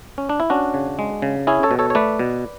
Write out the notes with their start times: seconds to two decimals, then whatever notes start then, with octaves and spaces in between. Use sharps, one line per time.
0.18 C#4
0.29 D4
0.40 E4
0.50 C#4 D4 F#4
0.74 C#3
0.99 G#3
1.22 C#3
1.47 C#4 E4 G#4
1.63 A4 C#5
1.71 B2
1.79 A4 C#5
1.90 C#5
1.95 A3 B4 D5
2.19 B2